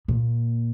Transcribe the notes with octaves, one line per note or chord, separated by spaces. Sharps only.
A#2